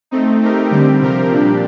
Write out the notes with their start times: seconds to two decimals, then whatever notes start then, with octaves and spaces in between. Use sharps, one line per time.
0.11 A3 C4 D#4
0.41 A3 C4 D#4 G4 A#4
0.71 D3 G3 C4 G4
1.01 C3 F3 C4 G4 A#4
1.31 A#2 G3 D4 G4